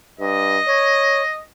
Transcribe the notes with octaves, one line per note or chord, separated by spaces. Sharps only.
G2 D#5
C#5